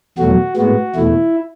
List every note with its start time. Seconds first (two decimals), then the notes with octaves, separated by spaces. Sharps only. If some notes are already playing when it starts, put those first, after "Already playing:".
0.18 E2 B2 F#3 A3 F#4
0.56 A2 G#3 B3 F#4
0.95 E2 B2 A3 E4